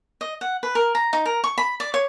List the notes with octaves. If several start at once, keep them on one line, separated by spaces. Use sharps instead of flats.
D#5
F#5
B4
A#4
A#5
D#4
A#4
C#6
B5
D5
C#5